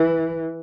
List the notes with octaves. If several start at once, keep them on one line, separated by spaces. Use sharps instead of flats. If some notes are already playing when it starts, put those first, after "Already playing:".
Already playing: E3